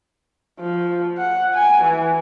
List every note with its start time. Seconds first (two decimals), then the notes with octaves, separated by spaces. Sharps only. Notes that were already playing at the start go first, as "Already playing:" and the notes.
0.60 F3
1.17 F#5
1.54 G#5
1.84 E3